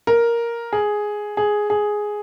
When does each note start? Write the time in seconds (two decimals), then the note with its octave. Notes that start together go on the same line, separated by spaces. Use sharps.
0.07 A#4
0.73 G#4
1.37 G#4
1.70 G#4